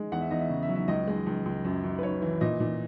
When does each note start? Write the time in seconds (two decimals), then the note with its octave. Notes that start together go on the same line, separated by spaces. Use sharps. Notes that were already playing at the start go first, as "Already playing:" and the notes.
Already playing: G#3
0.12 E2 F#5
0.21 E5
0.31 E2 D#5
0.40 E5
0.50 C#3
0.63 E5
0.69 F#3
0.75 E5
0.88 C#2 D#5
1.07 G#3
1.26 C#2
1.46 C#2
1.65 F#2
1.84 F#2
1.99 B4
2.03 F#2 C#5
2.22 E3
2.41 A#2 D#5
2.60 A#2